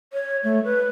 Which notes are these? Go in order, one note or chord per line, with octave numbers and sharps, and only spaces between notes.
C#5
A3
B4